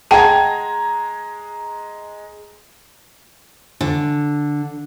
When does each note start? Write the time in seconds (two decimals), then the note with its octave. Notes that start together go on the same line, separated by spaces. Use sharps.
0.11 G#3 F#5 G5 A5 A#5 G#6
3.81 D3